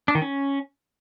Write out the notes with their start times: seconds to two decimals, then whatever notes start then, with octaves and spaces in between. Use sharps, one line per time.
0.08 D4
0.15 D#3
0.22 C#4